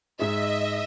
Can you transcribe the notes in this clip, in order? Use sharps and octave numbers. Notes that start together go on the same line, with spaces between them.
G#2 G#4 D#5 E5